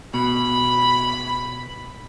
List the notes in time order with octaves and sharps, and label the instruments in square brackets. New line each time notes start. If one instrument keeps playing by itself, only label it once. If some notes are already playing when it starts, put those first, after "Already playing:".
[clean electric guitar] B2 [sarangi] B5